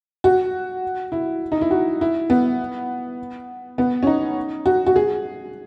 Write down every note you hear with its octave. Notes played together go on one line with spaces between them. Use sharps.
F#4
E4
D#4
E4
F#4
E4
B3
B3
C#4
D#4
F#4
F#4
G#4